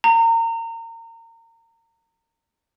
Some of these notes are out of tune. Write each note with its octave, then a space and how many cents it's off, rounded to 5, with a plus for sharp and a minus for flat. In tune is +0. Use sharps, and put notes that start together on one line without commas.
A#5 -30